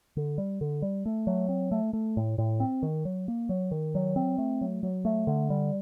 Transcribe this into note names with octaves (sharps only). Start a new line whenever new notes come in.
D3
G3
D3
G3
A3
F#3
C4
A3
A3
A2
A2
C4
D#3
F#3
A#3
F#3
D#3
F#3
C4
A3
F#3
F#3
A3
D3
G3